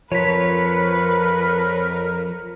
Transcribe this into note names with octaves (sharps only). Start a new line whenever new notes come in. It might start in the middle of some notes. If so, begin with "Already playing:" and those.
F2 F3 A#4 B4 C#5 B6